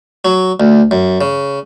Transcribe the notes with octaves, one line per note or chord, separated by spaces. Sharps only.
F#3
D2
F#2
C#3